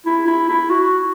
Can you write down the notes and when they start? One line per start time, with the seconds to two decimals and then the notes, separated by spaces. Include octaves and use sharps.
0.06 E4
0.27 E4
0.49 E4
0.70 F#4